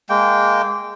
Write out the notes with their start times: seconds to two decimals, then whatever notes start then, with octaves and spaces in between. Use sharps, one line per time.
0.10 G#3 A#3 G5